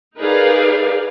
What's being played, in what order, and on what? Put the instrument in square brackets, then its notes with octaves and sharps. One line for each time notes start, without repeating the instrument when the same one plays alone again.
[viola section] D#4 G#4 A#4 B4 D5 F5